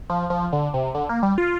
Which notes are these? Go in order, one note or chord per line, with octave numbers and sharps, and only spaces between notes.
F3
F3
D3
C3
D3
A#3
G3
F4